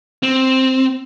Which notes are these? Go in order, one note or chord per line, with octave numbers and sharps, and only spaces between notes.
C4